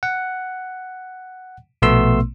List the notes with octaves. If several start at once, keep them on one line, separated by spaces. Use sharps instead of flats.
F#5
A#1 B2 A3 B3 C6 E6